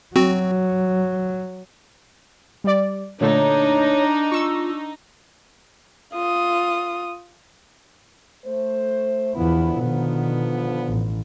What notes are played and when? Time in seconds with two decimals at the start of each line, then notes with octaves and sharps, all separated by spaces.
0.16 F#3 C4 F#4
2.64 G3 D5
3.21 A#2 D3 A3 D4 D#4 C#5
4.31 F4 C#6 E6
6.13 F4 D#6
8.45 A3 C5
9.35 E2 D3 F3 B3 E4
9.79 B2 D#3
10.88 A1